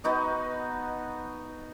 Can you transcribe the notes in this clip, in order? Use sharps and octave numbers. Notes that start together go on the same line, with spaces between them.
B3 D#4 F#4 D#5